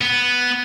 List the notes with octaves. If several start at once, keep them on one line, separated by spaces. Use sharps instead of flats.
B3